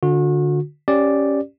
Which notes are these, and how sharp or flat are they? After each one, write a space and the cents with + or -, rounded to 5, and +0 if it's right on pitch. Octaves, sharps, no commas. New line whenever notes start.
D3 +0 F#4 -40
C#4 +0 G4 +0 D5 +0